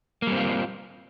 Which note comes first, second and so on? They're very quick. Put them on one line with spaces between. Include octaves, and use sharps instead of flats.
A#3 G3 C4 F4